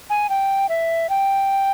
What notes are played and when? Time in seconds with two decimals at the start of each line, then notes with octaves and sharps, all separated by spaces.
0.10 G#5
0.29 G5
0.69 E5
1.09 G5